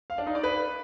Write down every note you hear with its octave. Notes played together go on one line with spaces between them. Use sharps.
F5
D4
D#4
D5
B4